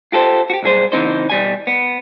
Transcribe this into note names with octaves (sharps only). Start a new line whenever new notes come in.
F4 G4 A4 C5
F#4 G4
B1 G2 G#4 C5
C#3 E3 C4 D#4 C5
B2 G3 G#5
B3